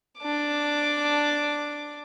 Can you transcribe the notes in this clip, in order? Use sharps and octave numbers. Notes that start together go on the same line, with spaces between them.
D4 D6